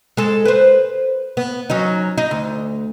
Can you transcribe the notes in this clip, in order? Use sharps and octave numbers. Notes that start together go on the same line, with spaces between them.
G#3 A4
B4 C5
B3
F#3 C#4 D#4
D#4
D2